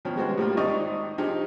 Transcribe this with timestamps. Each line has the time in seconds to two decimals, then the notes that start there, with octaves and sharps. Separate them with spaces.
0.05 B2 D#3 F3 C#4
0.17 G3 G#3 B3 F#4 C5
0.38 A2 G3 A#3 F4
0.57 G#1 C4 D#4 D5 D#5 C#6
1.18 F3 D#4 G4 G#4